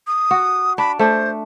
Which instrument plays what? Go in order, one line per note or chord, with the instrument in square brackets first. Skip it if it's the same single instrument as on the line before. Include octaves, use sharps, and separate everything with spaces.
[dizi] D#6
[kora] F#4
[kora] D4 [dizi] B5
[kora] A3 D4 [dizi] C5